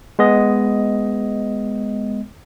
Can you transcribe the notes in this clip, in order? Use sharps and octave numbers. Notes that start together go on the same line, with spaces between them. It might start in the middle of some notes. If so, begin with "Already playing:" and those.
G#3 B3 D#5